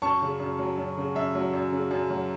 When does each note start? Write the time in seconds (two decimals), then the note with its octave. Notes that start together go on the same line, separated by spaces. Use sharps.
0.02 F#2 A5 C#6
0.22 C#3
0.40 F#2
0.59 F#3
0.78 F#2
0.97 C#3
1.15 F#2 E5
1.35 F#3
1.54 F#2
1.72 C#3
1.91 F#2
2.10 F#3